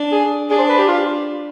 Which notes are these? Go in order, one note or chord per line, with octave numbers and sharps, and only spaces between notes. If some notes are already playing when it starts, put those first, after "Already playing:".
Already playing: D4
G#4
D4 G#4
C5
B4
G4
F4